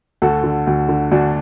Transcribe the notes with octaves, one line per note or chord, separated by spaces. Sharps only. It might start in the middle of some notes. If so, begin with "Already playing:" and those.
D2 F#4 A4
D3
D2
D3
D2 D4 F#4